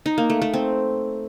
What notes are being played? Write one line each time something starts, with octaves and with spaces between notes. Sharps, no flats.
D#4
A#3
A3
A3
C4